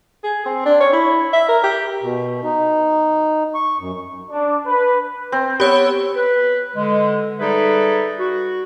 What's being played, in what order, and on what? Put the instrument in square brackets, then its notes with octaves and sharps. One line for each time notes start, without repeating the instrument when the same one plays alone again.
[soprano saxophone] G#4
C4
D4
C#5
E4
E5
A#4
G4
[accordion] B2
D#4
C#6
F#2
[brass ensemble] D4
B4
[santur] C4
[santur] B3 [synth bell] G4 C#5 E6
[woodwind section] B4
D3 G#3
G3 D#4 G#4 A4 B4 E5
F#4